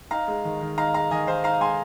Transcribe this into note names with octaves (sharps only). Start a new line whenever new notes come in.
D#4 F5 A#5
G#3
D#3
D#3
D#4 F5 A#5
G#3 F5 A#5
D#3 D#5 G#5
D#3 C5 F5
D#4 F5 A#5
G#3 G#5 C6